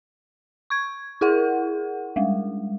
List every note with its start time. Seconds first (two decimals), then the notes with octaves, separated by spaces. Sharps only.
0.70 C#6 G#6
1.21 E4 G#4 A#4 F#5
2.16 G3 G#3